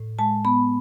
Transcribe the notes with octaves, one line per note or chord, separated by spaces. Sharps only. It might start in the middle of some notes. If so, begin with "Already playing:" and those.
Already playing: A2
G#3 A5
B3 B5